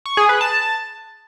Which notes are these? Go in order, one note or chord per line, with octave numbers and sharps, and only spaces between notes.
C#6
G#4
B4
A5